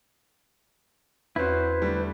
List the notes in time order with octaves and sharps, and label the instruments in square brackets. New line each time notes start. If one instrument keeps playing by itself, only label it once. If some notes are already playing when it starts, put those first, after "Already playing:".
[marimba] E2 [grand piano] C4 C#4 F#4 [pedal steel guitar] E4 C5 [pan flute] B4
[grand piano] D3 G3 A3